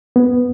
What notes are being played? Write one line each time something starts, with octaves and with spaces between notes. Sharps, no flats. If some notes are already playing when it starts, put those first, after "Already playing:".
B3